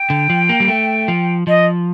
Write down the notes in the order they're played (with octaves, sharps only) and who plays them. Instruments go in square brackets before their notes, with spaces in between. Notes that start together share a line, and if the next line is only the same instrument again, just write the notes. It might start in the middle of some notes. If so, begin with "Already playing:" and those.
Already playing: [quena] G5
[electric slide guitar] D3
F3
A#3
G3
A3
F3
[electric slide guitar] F3 [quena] D#5